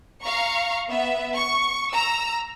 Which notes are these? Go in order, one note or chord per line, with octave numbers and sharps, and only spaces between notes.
F5 A#5 C#6
B3 E5
C#6
A#5 E6